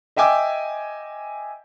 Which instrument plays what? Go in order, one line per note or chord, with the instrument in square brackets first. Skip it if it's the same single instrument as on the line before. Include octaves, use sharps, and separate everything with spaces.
[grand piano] D#5 E5 G5 G#5 D6 E6